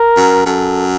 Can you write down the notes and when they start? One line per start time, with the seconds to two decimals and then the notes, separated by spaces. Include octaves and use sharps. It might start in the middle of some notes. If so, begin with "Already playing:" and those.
Already playing: A#4
0.17 F#2
0.46 F#2 A4